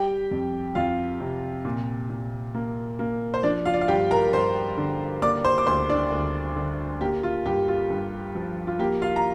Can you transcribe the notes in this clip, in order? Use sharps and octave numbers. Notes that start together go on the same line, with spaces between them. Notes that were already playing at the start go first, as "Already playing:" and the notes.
Already playing: G3 G4 G5
F2
F2 F4 F5
C3
A#2
A#2
A#3
A#3
C5
F3 D4 D5
F4 F5
D5
F5
G2 G4 G5
A#4 A#5
G2 C5 C6
D3
A#3 D5 D6
C5 C6
D6
D2 C5 C6
D4 D5
D2
D3
A#3 G4
F4
G2 G4
F4
G2
F3
F4
A#3 G4
F4 F5
A#5